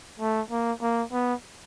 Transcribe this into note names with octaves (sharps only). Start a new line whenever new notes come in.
A3
A#3
A#3
B3